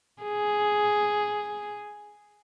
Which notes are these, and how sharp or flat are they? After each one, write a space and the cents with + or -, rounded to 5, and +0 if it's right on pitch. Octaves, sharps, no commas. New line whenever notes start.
G#4 +5